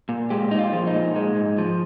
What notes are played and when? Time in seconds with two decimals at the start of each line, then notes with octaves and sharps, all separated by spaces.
0.09 A#2
0.30 G#3 G4
0.51 A#2 D#4
0.59 F4
0.73 F3
0.87 D#4
0.95 A#2
1.16 G#3
1.36 G#2
1.58 F3